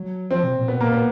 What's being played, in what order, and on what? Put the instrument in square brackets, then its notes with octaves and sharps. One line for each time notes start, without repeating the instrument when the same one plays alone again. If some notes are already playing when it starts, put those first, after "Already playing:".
Already playing: [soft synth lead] F#3
[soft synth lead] F3 [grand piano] C4
[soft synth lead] B2
A#2
[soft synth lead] A#2 [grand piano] B3
[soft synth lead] B2
[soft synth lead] A#2 [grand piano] A#3
[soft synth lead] A#2 [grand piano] B3